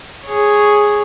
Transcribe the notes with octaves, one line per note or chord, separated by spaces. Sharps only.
G#4 C#5